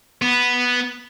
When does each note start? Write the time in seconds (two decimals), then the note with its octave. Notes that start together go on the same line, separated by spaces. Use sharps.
0.22 B3